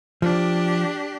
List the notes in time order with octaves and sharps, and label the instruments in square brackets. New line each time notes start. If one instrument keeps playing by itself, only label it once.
[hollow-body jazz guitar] F3 [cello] D4 G4